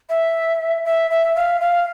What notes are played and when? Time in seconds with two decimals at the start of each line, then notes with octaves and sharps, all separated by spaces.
0.09 E5
0.85 E5
1.11 E5
1.36 F5
1.61 F5